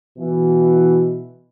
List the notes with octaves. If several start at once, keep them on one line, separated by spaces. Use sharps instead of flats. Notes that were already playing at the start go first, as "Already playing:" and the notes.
B2 E3